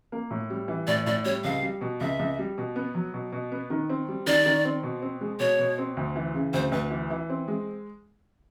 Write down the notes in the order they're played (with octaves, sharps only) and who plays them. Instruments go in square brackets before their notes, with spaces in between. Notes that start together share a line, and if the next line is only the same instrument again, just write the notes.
[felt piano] A#3
A2
G3
E3
[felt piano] A2 [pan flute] D5
[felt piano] A2 [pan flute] D5
[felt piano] G3 [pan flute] C#5
[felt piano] C#2 [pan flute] F5
[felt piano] G3
B2
[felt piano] C#2 [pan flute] E5
[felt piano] C#2
G3
B2
B3
F#3
B2
B2
B3
D#3
C4
G3
[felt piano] D#3 [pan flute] D5
[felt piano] D#3
C4
B2
C4
G#3
[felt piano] B2 [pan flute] C#5
[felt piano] B2
C4
D2
E3
C#3
[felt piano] D2 [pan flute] C5
[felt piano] D2 [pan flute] B4
[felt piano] E3
E3
C4
G#3